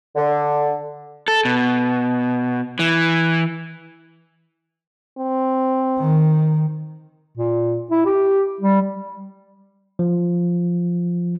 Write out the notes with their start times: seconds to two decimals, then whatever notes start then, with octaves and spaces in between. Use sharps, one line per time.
0.16 D3
1.28 A4
1.45 B2
2.79 E3
5.18 C4
5.99 D#3
7.37 A#2
7.91 E4
8.06 G4
8.61 G3
9.99 F3